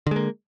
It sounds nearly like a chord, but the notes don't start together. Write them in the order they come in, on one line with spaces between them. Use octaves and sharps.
D3 G#3 A#3